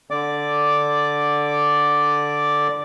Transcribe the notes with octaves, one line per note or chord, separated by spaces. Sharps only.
D3 D5 D6